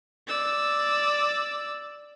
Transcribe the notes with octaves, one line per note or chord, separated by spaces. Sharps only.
D5 E6